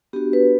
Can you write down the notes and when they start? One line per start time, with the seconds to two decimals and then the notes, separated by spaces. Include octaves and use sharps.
0.13 B3 D4 F#4 G4
0.33 B4